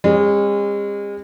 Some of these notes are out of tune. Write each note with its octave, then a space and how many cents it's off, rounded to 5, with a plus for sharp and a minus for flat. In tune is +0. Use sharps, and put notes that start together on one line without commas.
G#3 -40 C#4 -40